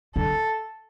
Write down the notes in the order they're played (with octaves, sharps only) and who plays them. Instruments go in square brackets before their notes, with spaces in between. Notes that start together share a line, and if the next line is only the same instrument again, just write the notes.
[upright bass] D3 [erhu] A4